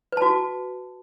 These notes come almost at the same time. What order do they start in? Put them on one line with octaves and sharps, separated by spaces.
B4 A5 F#4